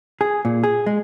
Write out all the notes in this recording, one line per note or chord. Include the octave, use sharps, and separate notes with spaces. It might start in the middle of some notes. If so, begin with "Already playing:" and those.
G#4
A#2
G#4
G#3